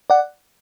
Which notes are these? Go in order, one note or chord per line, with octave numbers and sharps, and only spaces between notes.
D5 F#5